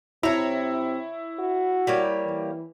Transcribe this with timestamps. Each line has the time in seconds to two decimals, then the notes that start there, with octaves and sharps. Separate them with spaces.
0.23 C3 E4 C#5 A#5
1.39 F#4
1.87 G3 A#3 C#5
2.25 E3